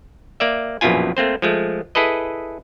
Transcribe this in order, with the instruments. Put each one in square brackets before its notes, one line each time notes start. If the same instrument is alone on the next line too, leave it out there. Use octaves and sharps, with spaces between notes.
[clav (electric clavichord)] A#3 D5 E5
A#1 F#2 B2 E4 F4 G#5
A3 A#3 C4 C5
F3 G#3 A3
E4 G#4 A4 B4 D#5